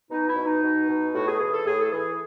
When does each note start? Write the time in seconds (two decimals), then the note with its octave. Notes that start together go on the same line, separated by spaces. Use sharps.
0.10 B2 D#4
0.28 E4
0.36 B2
0.45 D#4
0.63 B2
0.88 B2
1.14 A2 F#4
1.27 G#4
1.40 E3 G#4
1.53 A4
1.66 A2 G#4
1.79 A4
1.91 E3 G#4